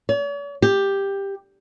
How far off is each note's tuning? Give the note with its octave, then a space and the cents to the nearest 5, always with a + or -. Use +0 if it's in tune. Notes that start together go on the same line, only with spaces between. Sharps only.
C#5 +45
G4 +10